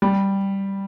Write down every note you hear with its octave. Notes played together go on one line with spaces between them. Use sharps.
G3